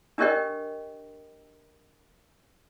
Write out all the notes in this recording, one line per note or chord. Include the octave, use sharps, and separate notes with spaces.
D4 G4 A#4 C#5 D#5 G5